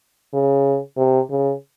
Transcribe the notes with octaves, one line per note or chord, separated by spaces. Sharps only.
C#3
C3
C#3